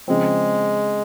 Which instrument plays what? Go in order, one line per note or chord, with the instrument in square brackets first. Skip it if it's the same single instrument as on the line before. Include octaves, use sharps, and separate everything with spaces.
[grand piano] C#3 F3 C4 [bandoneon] G#3